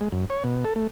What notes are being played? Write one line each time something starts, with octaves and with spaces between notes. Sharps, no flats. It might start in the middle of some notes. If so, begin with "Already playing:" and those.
G#3
F#2
C#5
B2
A4
A3